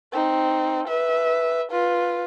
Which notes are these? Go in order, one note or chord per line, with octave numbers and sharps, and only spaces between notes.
C4 D#4
B4 E5
F4 B4